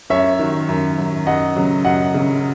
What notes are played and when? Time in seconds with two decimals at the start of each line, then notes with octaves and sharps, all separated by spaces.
0.10 F#2 C#5 E5
0.39 D#3 F#3
0.69 F#2
0.98 D#3 F#3
1.26 F#2 D#5 F#5
1.56 C#3 F#3
1.84 F#2 D#5 F#5
2.14 C#3 F#3